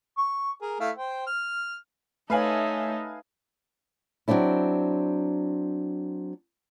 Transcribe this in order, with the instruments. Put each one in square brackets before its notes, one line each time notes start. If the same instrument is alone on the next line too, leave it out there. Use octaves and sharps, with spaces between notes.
[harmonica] C#6
G#4 A#4
A3 E4 F5
C5 G5
F6
[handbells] A3 C#5 [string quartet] D#4 A4 E5 [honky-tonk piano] B4 F5 G#5
[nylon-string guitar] F#3 A#3 C4 D4 E4